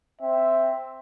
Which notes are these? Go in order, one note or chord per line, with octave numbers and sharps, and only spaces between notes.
C4 E5